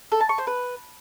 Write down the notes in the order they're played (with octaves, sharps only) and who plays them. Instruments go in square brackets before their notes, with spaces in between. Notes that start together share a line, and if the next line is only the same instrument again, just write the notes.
[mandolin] A4
A5
C#6
C5
B4